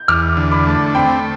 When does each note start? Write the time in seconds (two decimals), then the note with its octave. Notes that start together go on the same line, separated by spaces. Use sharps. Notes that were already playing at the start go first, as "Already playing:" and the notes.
Already playing: G6
0.08 E2 D6 F6
0.37 D3
0.52 B5 D6
0.67 A3
0.95 C4 G5 B5